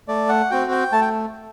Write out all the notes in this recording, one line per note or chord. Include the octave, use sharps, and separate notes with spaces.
A3 D5
F#5
C4 F#4 G5
G5
A3 A5
G5